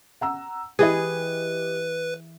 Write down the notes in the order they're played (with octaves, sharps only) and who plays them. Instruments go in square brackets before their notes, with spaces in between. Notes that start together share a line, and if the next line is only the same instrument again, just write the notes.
[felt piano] F#5 A#5 E6
[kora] E3 G#4 [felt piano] G4 D#5 [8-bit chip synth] B4